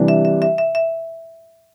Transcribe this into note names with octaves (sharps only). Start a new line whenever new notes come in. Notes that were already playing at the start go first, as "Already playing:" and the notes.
Already playing: C3 E3 G3 D4
E5
E5
E5
E5
E5